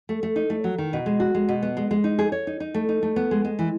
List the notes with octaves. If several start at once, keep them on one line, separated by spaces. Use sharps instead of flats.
A3
A3
D#4
A3
F#3
D#3
B2
G#3
F#4
G#3
B2
B3
G#3
G#3
D#4
G#4
C#5
D#4
D#4
A3
D#4
A3
B3
G#3
G#3
E3